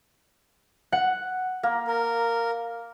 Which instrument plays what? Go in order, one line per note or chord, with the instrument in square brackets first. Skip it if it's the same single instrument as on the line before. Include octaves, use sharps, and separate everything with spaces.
[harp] F#5
[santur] A#3
[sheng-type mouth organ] A#4